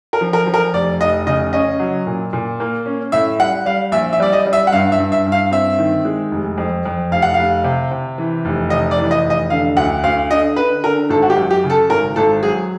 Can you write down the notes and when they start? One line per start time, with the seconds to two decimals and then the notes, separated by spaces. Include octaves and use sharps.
0.13 A#4
0.21 F3
0.33 A#4
0.47 F3
0.54 A#4
0.73 F1 D5
1.00 F1 D#5
1.26 C#3 D#5
1.53 C#4 D#5
1.79 F#3
2.07 A#2
2.33 A#2
2.60 A#3
2.86 C#4
3.12 A2 E5
3.39 G3 F#5
3.66 G3 F5
3.92 A#1 E5
4.13 E5
4.20 G3 D5
4.33 D#5
4.46 G3
4.53 E5
4.67 F#5
4.72 G2 F5
4.92 E5
4.98 G2
5.12 E5
5.26 G2
5.32 F5
5.51 C4 E5
5.78 D#3
6.05 G#3
6.32 F1
6.58 F2
6.85 F2
7.11 F1 F5
7.22 F#5
7.34 F1 F5
7.64 C3
7.91 C3
8.18 E3
8.45 F1
8.70 C3 D#5
8.91 D5
8.98 E3
9.11 D#5
9.25 F1
9.30 D#5
9.50 D3 F5
9.77 D2 F#5
10.04 D2 F5
10.31 D3 D#5
10.56 D3 B4
10.84 D3 A#4
11.10 G#1 A4
11.22 F#4
11.30 G4
11.36 F#2
11.51 G4
11.64 C#3
11.70 A4
11.90 G#1 A#4
12.16 G#1 A4
12.43 F#3 G#4